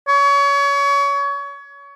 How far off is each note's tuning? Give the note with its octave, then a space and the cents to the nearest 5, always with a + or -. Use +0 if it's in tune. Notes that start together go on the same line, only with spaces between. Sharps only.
C#5 +30